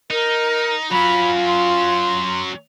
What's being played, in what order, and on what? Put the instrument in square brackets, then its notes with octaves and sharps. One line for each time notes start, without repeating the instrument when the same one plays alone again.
[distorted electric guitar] D#4 [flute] A#4
[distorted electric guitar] F#3 C#4 [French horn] F4 [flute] B5
[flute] C6